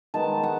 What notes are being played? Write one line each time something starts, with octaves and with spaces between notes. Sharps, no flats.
D#3 G#3 B3 A5
F#5